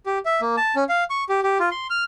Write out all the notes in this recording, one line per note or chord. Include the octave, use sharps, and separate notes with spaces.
G4
E5
A#3
A5
C#4
F5
C#6
G4
G4
F4
C6
F6